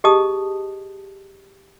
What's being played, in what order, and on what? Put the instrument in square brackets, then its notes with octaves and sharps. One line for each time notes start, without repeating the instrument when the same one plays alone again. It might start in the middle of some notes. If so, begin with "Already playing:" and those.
[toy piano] G4 G#4 D#5 A5 D#6